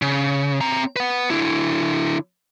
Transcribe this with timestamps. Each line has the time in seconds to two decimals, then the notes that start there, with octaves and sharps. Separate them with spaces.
0.02 C#3
0.61 C4 A#5
0.96 B4 F#5
1.30 D3 E4